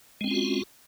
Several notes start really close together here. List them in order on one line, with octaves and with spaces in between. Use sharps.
G#3 C4 C#4 F4 F#4